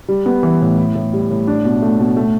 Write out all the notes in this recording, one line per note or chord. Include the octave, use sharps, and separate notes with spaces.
G3
B3
E3
A2
E4
A2
G3
A2
D4
B2
A3
B2
A3